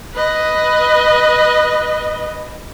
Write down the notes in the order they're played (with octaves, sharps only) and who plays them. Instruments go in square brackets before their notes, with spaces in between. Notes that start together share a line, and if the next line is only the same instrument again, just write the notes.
[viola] B4 D#5